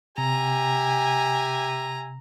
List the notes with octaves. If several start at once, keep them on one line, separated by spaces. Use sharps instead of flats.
C3 G4 E5 G#5 A#5